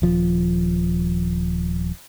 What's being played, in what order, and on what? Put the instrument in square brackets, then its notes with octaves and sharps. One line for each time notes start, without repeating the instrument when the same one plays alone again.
[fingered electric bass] D#1 F3